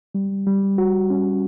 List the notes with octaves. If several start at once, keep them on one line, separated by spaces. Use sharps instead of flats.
G3
G3
F#4
C#4